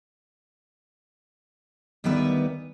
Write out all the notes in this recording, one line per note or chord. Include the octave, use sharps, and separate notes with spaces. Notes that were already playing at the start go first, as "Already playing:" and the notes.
D2 D#3 G3 B3 B4 E5